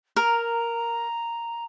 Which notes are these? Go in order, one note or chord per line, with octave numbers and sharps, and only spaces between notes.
A#4 A#5